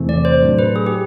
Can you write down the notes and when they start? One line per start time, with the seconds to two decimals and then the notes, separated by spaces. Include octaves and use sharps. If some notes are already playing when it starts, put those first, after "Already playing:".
Already playing: E2 C3 E3 A3 C4
0.09 D5
0.25 C5
0.42 A2 F#3 A3 D4
0.59 B4
0.76 G#4
0.86 G4